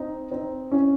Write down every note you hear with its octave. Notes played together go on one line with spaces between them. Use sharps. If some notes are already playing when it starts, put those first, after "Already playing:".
Already playing: C4 D#4
C4 D#4
C#4 E4